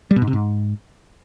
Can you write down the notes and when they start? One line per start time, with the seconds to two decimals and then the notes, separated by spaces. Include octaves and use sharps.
0.11 G3
0.16 B2
0.22 G#2
0.27 C3
0.33 G#2